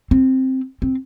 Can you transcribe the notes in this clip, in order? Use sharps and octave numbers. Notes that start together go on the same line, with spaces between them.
C4
C4